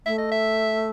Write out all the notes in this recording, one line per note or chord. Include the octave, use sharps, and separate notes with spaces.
A3 E5
D#5
E5